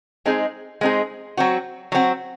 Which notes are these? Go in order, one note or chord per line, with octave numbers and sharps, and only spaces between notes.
G#3 C4 D#4 G#4
G#3 C4 D#4 G#4
F#3 C4 F#4
F#3 C4 F#4